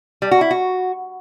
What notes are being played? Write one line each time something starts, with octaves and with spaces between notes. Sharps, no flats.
G3
F#4
E4
F#4